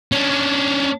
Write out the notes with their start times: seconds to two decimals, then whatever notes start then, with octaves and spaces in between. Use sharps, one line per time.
0.12 C#4 D4